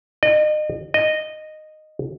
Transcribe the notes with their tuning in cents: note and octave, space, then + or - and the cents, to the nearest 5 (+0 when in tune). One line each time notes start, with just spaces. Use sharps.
D#5 -35
D#5 -10